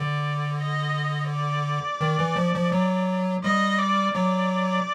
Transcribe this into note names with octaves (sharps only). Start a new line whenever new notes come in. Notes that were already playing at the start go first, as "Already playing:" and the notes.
Already playing: D3 D5
D#5
D5
D#3
E3
F3
F3
F#3
G3 D#5
D5
F#3 D5